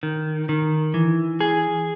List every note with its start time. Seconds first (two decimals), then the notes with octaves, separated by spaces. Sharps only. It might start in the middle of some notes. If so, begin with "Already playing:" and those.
0.03 D#3
0.49 D#3
0.94 E3
1.41 G#4